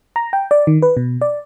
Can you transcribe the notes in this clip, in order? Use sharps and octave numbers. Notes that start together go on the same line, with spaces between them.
A#5
G5
D5
D#3
B4
B2
D5